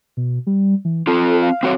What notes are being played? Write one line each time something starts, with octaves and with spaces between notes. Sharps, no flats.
B2
G3
E3
C4 F4 A4
F5
C4 F#4 C#5